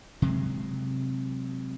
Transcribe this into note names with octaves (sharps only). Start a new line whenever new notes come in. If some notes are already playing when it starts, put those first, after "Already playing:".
C3 F#3 G#3